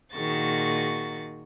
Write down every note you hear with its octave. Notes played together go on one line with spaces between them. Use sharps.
A#2 D#3 F#4 G#4 C#6 A6